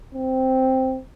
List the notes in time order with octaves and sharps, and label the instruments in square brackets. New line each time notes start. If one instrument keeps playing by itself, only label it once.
[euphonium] C4